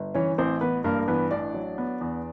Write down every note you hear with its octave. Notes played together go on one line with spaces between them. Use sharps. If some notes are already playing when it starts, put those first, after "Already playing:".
Already playing: G1
E3 C#4 C#5
A1 C4 C5
A1 B3 B4
G2 A#3 A#4
A#4
E3 B3 B4
A1 D4 D5
F#3
B3
E2